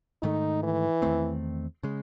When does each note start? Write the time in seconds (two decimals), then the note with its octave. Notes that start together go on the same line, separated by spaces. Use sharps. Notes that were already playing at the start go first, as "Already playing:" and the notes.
0.22 G#2 D#3 A3 D#4
0.63 E3
1.02 E2 D#3 A3 C4
1.83 C#3 G#3